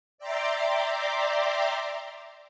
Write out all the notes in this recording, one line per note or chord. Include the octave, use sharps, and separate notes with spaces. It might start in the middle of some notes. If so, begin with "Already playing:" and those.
D5 E5 G5 A#5 C6 D6